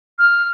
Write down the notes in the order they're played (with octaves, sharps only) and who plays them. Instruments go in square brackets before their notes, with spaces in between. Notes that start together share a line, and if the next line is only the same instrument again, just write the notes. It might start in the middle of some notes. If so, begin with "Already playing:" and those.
[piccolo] F6